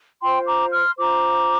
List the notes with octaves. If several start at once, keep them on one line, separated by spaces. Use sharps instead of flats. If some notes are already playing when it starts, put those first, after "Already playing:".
F4 C5 G5 C6
A#5 D6
C6 F6
F4 C5 A#5 D6